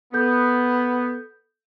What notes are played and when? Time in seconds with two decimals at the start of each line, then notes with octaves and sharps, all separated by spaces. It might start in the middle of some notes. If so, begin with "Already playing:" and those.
0.14 B3 A4 G6